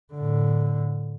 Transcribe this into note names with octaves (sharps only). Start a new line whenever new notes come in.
A2 D3